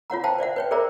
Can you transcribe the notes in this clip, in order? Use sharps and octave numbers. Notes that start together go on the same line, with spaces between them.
F4 C#5 F#5 A#5
C5 F5 G5 A5 A#5
C5 D5 E5 F#5
B4 C#5 G5
G#4 A#4 C5 D5 E5 A#5